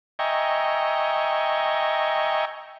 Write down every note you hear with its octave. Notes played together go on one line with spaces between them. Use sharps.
D#5 E5 G5 G#5 A#5 C#6